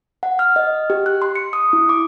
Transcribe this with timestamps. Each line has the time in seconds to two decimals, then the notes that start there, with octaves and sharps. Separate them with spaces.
0.23 F#5
0.39 F6
0.56 D#5
0.90 G4
1.06 F#6
1.22 C6
1.35 C#7
1.53 D#6
1.73 E4
1.89 D6